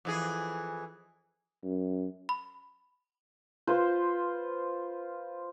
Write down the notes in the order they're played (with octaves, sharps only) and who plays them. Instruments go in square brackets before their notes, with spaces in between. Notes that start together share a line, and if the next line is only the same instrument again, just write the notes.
[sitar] F2 E3 G#4
[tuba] F#2
[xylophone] B5
[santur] F4 B4 C5